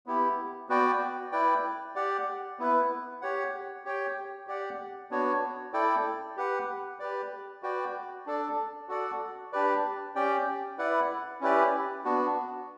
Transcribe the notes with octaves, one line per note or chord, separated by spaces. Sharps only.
B3 E4 G4
B3 F#4 B4 D5 G5
E4 B4 D5 G5
G4 D5 F#5
B3 E4 B4
G4 C#5 F#5
G4 C#5 G5
G4 D5 F#5
B3 D4 F#4 C#5
E4 A4 D5 G5
G4 B4 F#5
G4 B4 D5
F#4 B4 D5 G5
D4 A4 D5
F#4 A4 D5 F#5
D4 G4 B4 D5
C#4 G4 D5 G5
E4 B4 D5 F#5
C#4 E4 G4 B4 D5
B3 D4 F#4